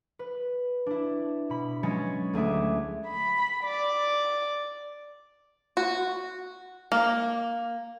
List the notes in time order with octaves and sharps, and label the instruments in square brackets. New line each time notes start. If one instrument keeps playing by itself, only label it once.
[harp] B4
D4 E4
B2 B5
F#3 G#3 C#4 C#5 B5 A6
D2 A3 G#4 E5 D6
[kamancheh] B5
D5
[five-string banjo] F#4
A#3